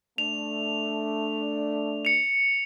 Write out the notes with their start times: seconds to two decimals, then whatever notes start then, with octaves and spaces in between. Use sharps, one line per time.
0.18 A3 D4 F7
2.05 C#7 F7